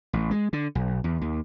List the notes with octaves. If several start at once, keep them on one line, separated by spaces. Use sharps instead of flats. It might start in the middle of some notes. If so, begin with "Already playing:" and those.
A1
G#3
D3
B1
E2
D#2